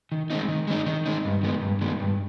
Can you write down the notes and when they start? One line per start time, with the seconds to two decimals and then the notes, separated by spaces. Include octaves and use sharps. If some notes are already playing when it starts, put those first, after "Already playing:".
0.12 D#3
0.30 G#3 C4 D#4
0.49 D#3
0.67 G#3 C4 D#4
0.86 D#3
1.06 G#3 C4 D#4
1.25 G2
1.43 D#3 G#3 B3
1.61 G2
1.81 D#3 G#3 B3
2.00 G2